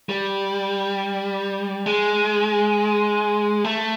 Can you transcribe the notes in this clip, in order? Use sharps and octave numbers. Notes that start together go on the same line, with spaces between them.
G3
G#3
A3